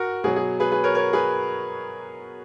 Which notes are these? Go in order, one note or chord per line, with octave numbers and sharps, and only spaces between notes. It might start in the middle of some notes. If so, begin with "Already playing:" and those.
Already playing: F#4 A#4
B2 F#3 G#4
G#4
G#4 B4
G#4 B4
A#4 C#5
A#4 C#5
G#4 B4